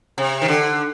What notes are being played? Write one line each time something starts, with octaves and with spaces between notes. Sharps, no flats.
C3
D#3
D3